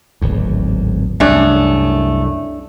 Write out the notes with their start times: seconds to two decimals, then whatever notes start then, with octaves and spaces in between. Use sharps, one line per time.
0.21 D1 G#1 E2
1.20 C2 F#2 A3 C#4 D4